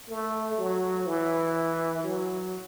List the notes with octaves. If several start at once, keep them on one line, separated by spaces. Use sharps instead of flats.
A3
F#3
E3
F#3